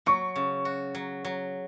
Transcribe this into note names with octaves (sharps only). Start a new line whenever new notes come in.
F#3 C#6
C#3
F#4
F#3
F#3